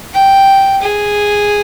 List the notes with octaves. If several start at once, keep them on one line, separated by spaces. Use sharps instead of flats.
G5
G#4